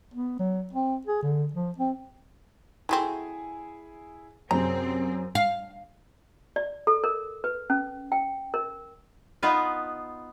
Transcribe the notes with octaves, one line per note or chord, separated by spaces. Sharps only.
B3
F#3
C4
G#4
D3
F3
C4
F#3 A3 C4 E4 G#4
F#2 C3 C4 G#4 A#5
F5
D5
A4
A#4
B4
C#4
G5
A#4
B3 D#4 F4 B4